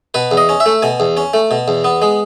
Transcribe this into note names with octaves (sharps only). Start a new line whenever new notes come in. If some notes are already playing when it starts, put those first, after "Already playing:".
B2 B4
E2
D#5
C#4
E5
A3
B2 G#5
E2
C#4
A3
B2
E2
B3
G#3